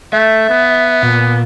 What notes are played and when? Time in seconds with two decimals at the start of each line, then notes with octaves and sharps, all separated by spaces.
0.13 A3 E5
0.50 B3
1.03 A#2